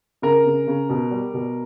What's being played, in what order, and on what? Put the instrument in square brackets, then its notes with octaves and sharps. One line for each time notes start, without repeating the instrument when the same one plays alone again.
[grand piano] C#3 A#4
C#3
C#3
B2
G3
B2